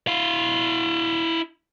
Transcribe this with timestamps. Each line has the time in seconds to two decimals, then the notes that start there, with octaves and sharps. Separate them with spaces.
0.07 E4 F5